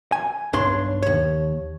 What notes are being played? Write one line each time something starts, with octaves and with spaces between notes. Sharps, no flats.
G#5
B1 G2 D4 C#5 C6
D#2 C#5